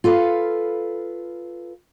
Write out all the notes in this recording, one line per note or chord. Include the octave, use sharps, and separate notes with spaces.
F4 A4 B4 F5